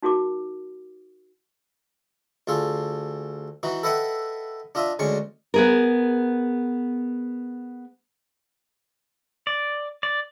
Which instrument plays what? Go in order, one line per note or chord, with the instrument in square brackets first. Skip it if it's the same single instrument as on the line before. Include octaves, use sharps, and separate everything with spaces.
[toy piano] D#4 F#4 G#4 A#4 D6
[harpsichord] D2 F4 G#4 A4
E3 D#4 F#4
A4 B4 D#5 E5 F#5 G5
D4 F4 D#5 E5
D2 D3 G#3 C#4 C#6
[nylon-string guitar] B3 G#4 A#4
[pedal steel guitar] D5
D5